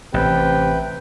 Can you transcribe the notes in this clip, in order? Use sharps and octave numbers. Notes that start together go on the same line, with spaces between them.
A1 C3 B4 G5